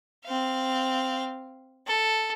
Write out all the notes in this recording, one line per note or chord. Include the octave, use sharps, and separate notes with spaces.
C4 F5
A4